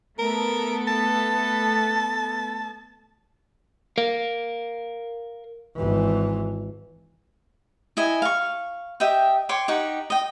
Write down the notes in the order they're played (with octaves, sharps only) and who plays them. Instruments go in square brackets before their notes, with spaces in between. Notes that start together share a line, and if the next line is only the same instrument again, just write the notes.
[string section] A3 B3 A4 [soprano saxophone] A#4
[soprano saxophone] A5
[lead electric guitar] A#4 F5
[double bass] G#1 E3
[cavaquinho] E4 D#5 G#5
F5 C#6
G4 D#5 E5 G5
C#5 G5 C6 D6
D#4 G4 F#5 C#6
D#5 G5